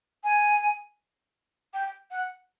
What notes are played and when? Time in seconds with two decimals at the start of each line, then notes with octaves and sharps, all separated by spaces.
0.24 G#5
1.74 G5
2.11 F#5